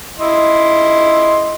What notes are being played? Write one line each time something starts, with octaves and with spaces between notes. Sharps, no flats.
E4 D#5 C6